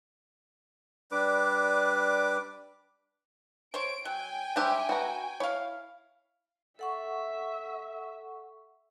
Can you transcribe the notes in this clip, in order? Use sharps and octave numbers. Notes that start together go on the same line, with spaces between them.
G3 D4 B4 D6
C5 C#5 D7
F#3 G5 G#5
G3 D4 G4 C5 E5
F#4 B4 A#5
E4 C#5 F5
A4 E5 F#5 C#6